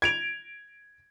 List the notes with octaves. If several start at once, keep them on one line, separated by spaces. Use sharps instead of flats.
G#6 D7 F7